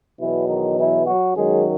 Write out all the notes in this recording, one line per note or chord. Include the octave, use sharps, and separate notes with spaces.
E2 B2 E3 F#3 E4
D#3 D#4
E3 E4
F#3 F#4
F#2 D#3 F#3 G#3 G#4